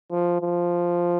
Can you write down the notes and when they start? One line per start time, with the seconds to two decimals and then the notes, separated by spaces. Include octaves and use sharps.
0.11 F3
0.41 F3